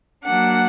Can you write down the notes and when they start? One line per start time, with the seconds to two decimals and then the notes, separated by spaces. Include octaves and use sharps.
0.23 F#3 A#3 D4 F#5